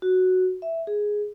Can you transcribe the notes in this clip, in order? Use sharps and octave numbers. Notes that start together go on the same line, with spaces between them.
F#4
E5
G#4